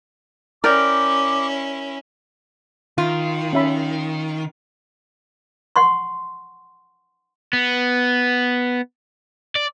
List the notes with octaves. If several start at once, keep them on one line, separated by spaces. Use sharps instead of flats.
C#4 E4 A#4 D5 G5 D6
D#3 F4
C#4 E5 B5
F#5 C6 C#6
B3
D5